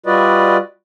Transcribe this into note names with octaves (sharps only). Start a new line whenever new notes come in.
G3 F4 F#4 B4 D5 D#5